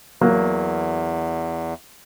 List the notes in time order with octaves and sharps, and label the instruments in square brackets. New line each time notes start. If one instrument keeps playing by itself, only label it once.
[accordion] E2 [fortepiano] F#3 A#3